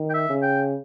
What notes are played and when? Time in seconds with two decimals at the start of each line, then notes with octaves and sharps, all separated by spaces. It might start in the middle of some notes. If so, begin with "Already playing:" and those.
Already playing: D#3
0.10 G5
0.14 E5
0.29 C#3
0.43 G5